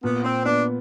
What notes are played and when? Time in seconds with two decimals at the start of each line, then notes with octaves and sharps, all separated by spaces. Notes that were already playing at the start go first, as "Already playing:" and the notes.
0.03 A#2 B3
0.24 C4
0.46 B3 D4